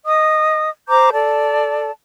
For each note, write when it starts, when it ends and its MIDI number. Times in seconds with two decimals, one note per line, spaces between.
0.06 0.69 75
0.06 0.69 87
0.88 1.11 72
0.88 1.11 82
0.88 1.11 86
0.88 1.11 91
1.13 1.91 69
1.13 1.91 74
1.13 1.91 81